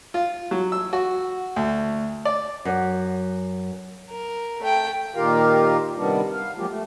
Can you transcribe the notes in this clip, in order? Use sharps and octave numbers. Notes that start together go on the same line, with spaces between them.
F4
F#3
E6
F#4
D2
D5
F#2
A#4
A3 G5
A#2 D#3 F4 G4 A#4 F5
C3 D#3 G3 B3 D4
F5
F3 F#3 G#3 A#3 F4 G4
A3